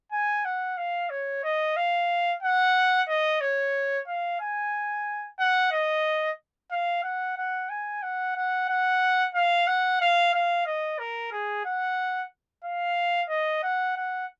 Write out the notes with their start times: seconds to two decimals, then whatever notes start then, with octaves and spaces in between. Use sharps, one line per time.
0.12 G#5
0.45 F#5
0.77 F5
1.10 C#5
1.44 D#5
1.76 F5
2.42 F#5
3.08 D#5
3.40 C#5
4.07 F5
4.40 G#5
5.39 F#5
5.72 D#5
6.71 F5
7.03 F#5
7.37 F#5
7.69 G#5
8.02 F#5
8.36 F#5
8.69 F#5
9.34 F5
9.67 F#5
10.01 F5
10.33 F5
10.66 D#5
10.99 A#4
11.31 G#4
11.65 F#5
12.64 F5
13.29 D#5
13.63 F#5
13.96 F#5